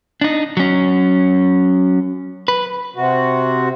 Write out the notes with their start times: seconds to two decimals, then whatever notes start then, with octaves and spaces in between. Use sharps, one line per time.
0.21 D4 D#4
0.57 F#3 C#4
2.48 B4
2.96 C3 F#4